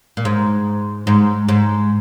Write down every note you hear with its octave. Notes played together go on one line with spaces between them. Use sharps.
A#2
G#2
G#2
G#2